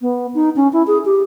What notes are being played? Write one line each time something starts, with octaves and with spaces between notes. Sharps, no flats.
B3
D#4
C#4
E4
G#4
G4